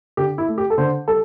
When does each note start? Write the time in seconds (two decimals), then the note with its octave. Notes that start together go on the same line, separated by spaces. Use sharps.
0.17 D3 G4
0.38 E4
0.48 A3
0.58 G4
0.70 A4
0.78 D3 C5
1.08 G3 A4